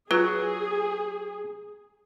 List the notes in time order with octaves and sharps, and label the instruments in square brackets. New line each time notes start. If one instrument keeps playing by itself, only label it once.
[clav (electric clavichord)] F#3 [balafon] F4 B4 [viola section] G#4